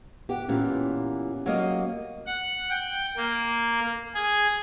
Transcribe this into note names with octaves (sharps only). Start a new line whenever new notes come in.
B3 G4 F#5
A#2 E3 C#4 G4
F#3 A#3 D#5
F#5
G5
A#3
G#4